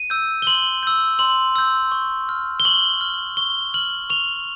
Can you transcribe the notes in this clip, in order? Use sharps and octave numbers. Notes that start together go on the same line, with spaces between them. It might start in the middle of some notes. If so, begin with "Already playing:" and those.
Already playing: D#7
E6 G6
G7
C6 F#7
E6 G6
C6 F#7
E6 G6
C#6
F6
G7
C#6 F#7
F6
C#6 G7
F6 F#7
C#6 F7